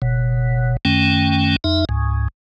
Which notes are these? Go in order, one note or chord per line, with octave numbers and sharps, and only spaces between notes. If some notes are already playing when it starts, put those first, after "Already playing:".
F#1 B2
F#2 D#3 A3 C#4 G5
F2 D#4 E5
C#2 G#2